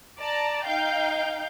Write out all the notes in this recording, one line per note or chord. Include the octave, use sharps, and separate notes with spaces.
D5 A5 A#5
D#4 F5 G5 G6